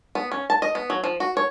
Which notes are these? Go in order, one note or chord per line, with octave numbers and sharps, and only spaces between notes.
B3
C#4
A5
D#5
B3
F#3
F3
F#4
C#5